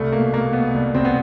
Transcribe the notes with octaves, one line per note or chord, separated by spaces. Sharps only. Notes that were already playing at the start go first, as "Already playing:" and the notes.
Already playing: C2 A3
B2 A#3
B2 A#3
B2 B3
C2
C2 C4
B3